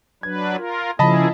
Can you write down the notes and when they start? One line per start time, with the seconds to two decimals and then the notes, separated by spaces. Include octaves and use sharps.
0.23 F#3 D4 B4 G#6
0.57 F4 A#4
0.99 C#3 F3 A#3 E4 G#4 D#5 A5 B5